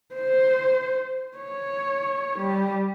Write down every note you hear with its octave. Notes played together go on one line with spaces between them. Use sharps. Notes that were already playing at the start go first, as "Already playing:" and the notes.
C5
C#5
G3